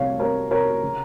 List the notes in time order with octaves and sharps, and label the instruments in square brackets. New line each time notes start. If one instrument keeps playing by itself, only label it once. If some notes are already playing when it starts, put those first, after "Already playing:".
Already playing: [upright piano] C2 C3 C#5 F5
G3 A#4 C#5
C3 A#4 C#5
C#3